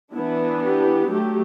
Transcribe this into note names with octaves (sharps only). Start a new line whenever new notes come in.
E3 B3 D4 E4
G4
F#3 A3 G4